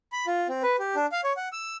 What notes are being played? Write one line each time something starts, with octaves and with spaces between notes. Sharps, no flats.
B5
F4
C4
B4
G4
D4
F5
C#5
F#5
E6